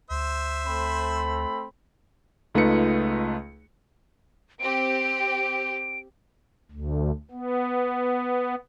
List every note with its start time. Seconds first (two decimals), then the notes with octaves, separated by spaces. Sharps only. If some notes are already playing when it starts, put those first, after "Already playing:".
0.10 D2 C5 E5
0.66 A3 C4 B5
2.55 C#2 A3 D#4 F4 B4 C#7
4.60 C4 G4 D7
6.71 D2
7.31 B3